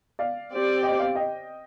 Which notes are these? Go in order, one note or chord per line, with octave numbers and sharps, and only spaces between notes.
D5 F5
C4 G4 D5
D#5 G5
D5 F5
D#5 G5